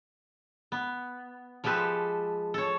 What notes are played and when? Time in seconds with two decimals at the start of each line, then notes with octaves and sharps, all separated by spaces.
0.72 B3
1.64 F3 G#3 G4 A4 B4
2.54 A4 C#5